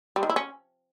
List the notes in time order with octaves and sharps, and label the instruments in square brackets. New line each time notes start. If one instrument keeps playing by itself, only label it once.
[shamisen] G3
D#3
E4
C#4